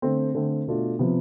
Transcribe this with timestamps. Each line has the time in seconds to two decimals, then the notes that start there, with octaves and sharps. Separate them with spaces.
0.02 D3 A3 C4
0.34 D3 A3 C4
0.67 B2 A3 D4 F4
0.99 C3 F3 B3